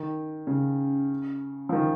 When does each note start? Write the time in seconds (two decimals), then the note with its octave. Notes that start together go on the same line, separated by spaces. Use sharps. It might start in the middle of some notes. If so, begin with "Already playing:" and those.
Already playing: D#3
0.47 C#3
1.69 F3
1.73 D#3